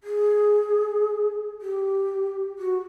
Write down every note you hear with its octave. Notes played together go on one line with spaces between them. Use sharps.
G#4
G4
F#4